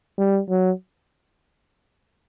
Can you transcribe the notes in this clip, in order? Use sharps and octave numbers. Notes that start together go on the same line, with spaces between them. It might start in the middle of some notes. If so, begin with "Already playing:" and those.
G3
F#3